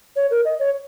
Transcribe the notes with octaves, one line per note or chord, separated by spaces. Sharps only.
C#5
A#4
D#5
C#5